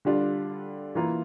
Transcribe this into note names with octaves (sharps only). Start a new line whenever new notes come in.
D3 G3 D4 F4
E3 A#3 F4